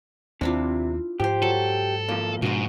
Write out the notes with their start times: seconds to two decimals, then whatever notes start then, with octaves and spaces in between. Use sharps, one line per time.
0.41 D#2 C3 A3 C4 D4 E4 F4
1.20 G#2 F3 G4 C5
1.42 F#3 A4
2.09 D#2 F3 A#3
2.42 G#2 B2 A#3 D4 F#4 D#5